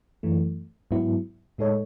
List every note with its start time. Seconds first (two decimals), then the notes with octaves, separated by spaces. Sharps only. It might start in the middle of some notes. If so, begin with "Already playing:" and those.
0.23 F#2 E3 A3
0.91 G#2 F#3 B3 E4
1.58 A2 G#3 D#4 A4 C#5